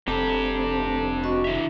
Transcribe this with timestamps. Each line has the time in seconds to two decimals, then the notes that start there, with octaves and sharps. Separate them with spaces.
0.07 F1 C4 D4 G4 A4 A5 A#5
1.23 F#4 D#5 C#6
1.44 D#3 D4 E4 E5